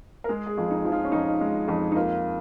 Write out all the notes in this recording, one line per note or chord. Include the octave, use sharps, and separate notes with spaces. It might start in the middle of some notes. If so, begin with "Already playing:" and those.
A#4
G#3 G#4
G#4
F2 F4
D#4
F3
F4
C#4
F2 D#4
G#3
F2
D#4
A#3 F4